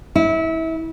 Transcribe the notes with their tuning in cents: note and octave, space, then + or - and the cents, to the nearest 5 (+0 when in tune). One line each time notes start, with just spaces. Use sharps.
E4 -25